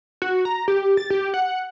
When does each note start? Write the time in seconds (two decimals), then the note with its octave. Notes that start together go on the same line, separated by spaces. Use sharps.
0.22 F#4
0.45 A#5
0.68 G4
0.97 A6
1.10 G4
1.34 F#5